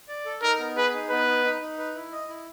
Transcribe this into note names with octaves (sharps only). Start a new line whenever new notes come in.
D5
A4
D#4 A#4
B3
G#4 B4
D#4
B3 B4
D#4
D#4
D#4
B4
E4
D#5
E4